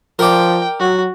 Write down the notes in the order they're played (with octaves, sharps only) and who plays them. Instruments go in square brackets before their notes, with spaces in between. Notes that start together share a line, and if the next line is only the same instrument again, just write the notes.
[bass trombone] F3 [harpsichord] A#4 D5 [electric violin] G5
[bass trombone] F#3 [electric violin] F#4